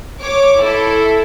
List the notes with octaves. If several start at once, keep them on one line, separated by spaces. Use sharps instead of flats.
C#5 D6
E4 A4